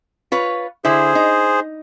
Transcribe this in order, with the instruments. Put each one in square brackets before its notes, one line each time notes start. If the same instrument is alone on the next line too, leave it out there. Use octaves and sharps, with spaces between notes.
[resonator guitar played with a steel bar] F4 B4 C#5
[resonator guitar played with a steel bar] D3 E4 [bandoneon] G#4 C5
[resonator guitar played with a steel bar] D#4